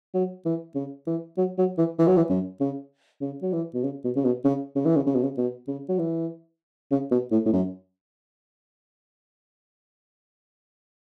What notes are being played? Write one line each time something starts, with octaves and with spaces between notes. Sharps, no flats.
F#3
E3
C#3
E3
F#3
F#3
E3
E3
F#3
E3
F#2
C#3
C#3
F#3
E3
B2
C#3
B2
C#3
B2
C#3
C#3
E3
C#3
C#3
B2
C#3
B2
C#3
F#3
E3
C#3
B2
A2
A2
F#2